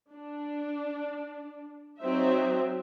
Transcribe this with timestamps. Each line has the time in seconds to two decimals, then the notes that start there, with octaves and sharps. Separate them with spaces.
0.12 D4
2.02 F#3 C4 D#4 C5 E5